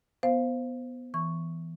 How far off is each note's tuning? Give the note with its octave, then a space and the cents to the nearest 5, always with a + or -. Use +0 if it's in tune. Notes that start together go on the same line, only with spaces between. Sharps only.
B3 +0 C5 +0 F5 +0
E3 +0 C#6 +0